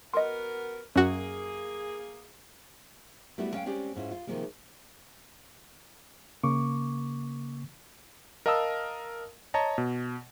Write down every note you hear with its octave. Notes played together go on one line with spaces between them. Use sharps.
B3 F#4 A#4 D#5 C6
F#2 A#3 C#4 F#4 G#4
G3 A3 B3 E4 F#4
G#3 C#4 C#5 D5 F5 G5
G#3 C4 C#4 G4 D5
G#2 C#4 E4 F4
F4
C3 D#3 F3 G#3 A#3
C#3 A#3 C#6 D6
A#4 D#5 F5 A5 D#6 E6
C#5 D#5 A5 A#5
B2